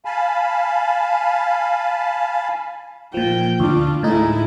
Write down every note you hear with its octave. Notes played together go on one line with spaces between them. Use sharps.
F5 G#5 A5 B5
A#2 F3 G5
D2 D4 F4
A2 G#3 D#4 E4